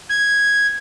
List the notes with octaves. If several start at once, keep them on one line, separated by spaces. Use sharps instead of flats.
G#6